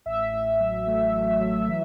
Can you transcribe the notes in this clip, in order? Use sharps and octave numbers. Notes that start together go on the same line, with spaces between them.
A1 E5
A1
F#3
A3
F#3
F#3
E3